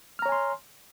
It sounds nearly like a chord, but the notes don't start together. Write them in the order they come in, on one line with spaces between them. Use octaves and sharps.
F6 A#5 C#5 G#5 C6